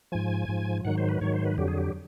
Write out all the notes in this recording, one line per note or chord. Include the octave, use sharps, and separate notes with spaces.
G#2 F3 G#5
G#2 F3
G#2 D#3 F#3 F#5
C5
B4
G#2 D#3 F#3 C#5
C5
B4
F2 D3 F#3 G4
G#4
G4